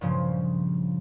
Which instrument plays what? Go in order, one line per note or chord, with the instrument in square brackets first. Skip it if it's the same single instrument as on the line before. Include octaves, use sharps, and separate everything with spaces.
[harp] G2 A#2 C#3 F3 C#4